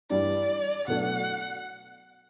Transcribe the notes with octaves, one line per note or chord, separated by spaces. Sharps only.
G2 E3 G3 D4 D5
B2 F#3 A3 D4 F#5